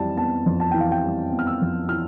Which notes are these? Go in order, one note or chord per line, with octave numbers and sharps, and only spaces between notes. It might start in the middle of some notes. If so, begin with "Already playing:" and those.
Already playing: F2 E3 G3 A5
B3 A5
F2
A5
E3 G5
F5
G5
G3
B3
F6
E6
F2
E3 F6